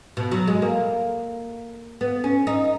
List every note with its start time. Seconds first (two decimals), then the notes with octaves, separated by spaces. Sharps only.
0.17 B2
0.32 F#3
0.48 G#3
0.62 A#3
2.01 B3
2.24 C#4
2.47 D#4